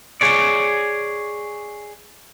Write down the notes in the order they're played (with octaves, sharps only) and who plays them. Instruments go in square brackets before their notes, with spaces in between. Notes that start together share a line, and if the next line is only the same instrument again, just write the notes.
[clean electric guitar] G#4 C#5 D5